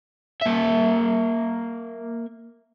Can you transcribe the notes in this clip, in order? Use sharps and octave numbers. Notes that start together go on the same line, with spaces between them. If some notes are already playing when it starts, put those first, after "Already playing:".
A#3 E5